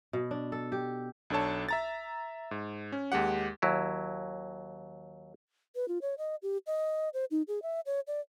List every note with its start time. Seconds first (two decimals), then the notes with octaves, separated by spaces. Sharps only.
0.13 B2
0.31 D4
0.52 A4
0.72 G4
1.30 B1 D4 A4 C#5 A5
1.69 E5 A#5 A6
2.51 G#2
2.92 C#4
3.12 D#2 G#3 G4 F#5
3.62 D#2 F#3 E4
5.76 B4
5.88 F4
6.02 C#5
6.18 D#5
6.43 G4
6.67 D#5
7.14 C5
7.31 D#4
7.48 G#4
7.62 E5
7.86 C#5
8.07 D5